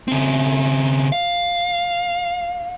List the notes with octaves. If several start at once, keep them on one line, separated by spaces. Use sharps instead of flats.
C#3 C4
F5